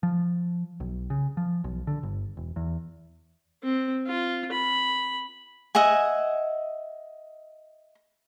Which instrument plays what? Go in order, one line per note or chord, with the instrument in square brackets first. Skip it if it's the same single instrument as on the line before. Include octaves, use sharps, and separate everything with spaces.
[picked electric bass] F3
B1
C#3
F3
B1
D3
G1
E1
E2
[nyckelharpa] C4
F4
B5
[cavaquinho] D#5 E5 F#5 G#5